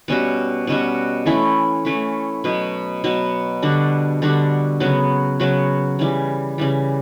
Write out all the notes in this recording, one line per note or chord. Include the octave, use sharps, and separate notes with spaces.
B2 G3 C#4 F#4
B2 G3 C#4 F#4
E3 A3 C#4 E4
E3 A3 C#4 E4
B2 F#3 B3
B2 F#3 B3
D3 G3 D4 F#4
D3 G3 D4 F#4
C#3 F#3 B3 F#4
C#3 F#3 B3 F#4
C#3 E3 G3
C#3 E3 G3